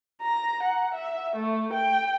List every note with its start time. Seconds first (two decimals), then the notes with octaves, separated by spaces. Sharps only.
0.22 A#5
0.63 F#5
0.94 E5
1.36 A3
1.73 G5